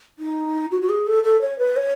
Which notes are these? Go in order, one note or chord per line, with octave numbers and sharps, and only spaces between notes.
D#4
F#4
F#4
G#4
A4
A4
C#5
B4
C#5